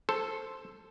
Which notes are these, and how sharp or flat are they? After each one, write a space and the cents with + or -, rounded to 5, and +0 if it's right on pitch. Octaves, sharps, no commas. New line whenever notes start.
A4 +0 C5 +0